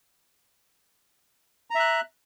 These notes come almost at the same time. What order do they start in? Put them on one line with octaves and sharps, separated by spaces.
A#5 E5 F#6